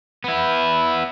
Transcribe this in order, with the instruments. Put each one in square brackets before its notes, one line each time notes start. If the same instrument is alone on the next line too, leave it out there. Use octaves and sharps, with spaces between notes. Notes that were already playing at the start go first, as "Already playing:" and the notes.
[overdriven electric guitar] B3 E4